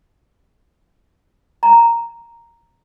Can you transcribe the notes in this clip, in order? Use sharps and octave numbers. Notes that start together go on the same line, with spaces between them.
A#5